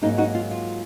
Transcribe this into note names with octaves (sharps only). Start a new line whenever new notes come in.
G#2 F#3 A#3 D#4
D#4 F#4
F4
F4